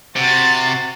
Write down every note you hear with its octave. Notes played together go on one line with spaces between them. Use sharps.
C3 F#4 A6